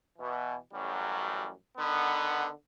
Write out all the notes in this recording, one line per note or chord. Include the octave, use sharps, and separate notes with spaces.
B2 E3
A1 F#2 F#3 G3
D3 D#3 B3